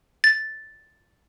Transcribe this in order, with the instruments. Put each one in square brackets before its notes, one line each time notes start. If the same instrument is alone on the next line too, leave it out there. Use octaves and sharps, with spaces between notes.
[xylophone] A6